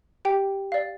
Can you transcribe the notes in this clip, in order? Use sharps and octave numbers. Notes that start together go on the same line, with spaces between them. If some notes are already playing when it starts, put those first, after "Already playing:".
G4 G5
D5 F5